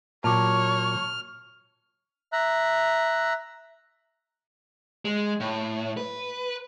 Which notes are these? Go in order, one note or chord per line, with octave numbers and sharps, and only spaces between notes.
A#2 F#3 C#5 A5 D6 F6
E5 A#5 F#6
G#3
A2
B4